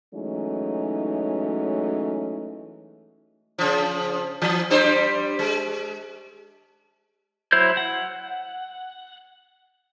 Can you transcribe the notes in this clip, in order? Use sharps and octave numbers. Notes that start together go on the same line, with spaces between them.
E3 F#3 G#3 A3 C#4 D#4
C#3 F3
E3
G3 D4 C5
G#3
F#3 E4 C5 G6
F#5